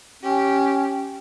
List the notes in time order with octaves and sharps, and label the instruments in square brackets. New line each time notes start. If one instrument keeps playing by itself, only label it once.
[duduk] C#4 [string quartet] G4